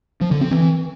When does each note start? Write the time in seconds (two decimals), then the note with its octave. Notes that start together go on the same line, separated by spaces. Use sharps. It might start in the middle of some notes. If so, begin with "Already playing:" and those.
0.21 F3
0.31 D3
0.41 C4
0.51 E3